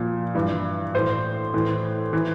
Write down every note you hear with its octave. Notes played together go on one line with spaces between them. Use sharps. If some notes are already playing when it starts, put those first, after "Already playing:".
Already playing: A#2 F3
G2 E3
A2 E3 C5
A2 E3
E3